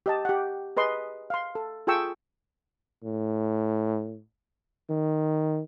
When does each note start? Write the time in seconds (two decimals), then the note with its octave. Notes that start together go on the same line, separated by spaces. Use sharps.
0.06 G4 D#5 A5
0.25 G4 F#5
0.77 G#4 B4 D#5 C6
1.30 F5 C6
1.55 A4
1.87 F4 G#4 A4 G5 C#6 E6
3.04 A2
4.89 D#3